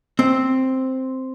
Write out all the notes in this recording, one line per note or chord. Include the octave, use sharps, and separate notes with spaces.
C4